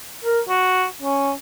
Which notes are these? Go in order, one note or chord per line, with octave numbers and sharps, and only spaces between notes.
A#4
F#4
C#4